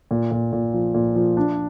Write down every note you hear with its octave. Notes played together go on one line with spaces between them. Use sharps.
A#2
A#2
A#2
F3
A#2
F3
D4